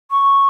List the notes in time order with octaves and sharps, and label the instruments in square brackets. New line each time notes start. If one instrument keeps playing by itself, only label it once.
[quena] C#6